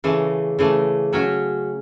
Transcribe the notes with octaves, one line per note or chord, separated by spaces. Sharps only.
C#3 E3 A3
C#3 E3 A3
F#3 C#4 F#4